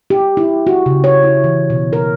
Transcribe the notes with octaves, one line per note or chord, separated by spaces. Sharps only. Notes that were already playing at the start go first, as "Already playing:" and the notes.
G4
E4
F#4
C#3
C#5
E4
E3
B2
A#4